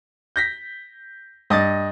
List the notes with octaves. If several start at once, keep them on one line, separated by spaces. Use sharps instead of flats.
G6 A#6 B6
G2 D#5 D#6 A6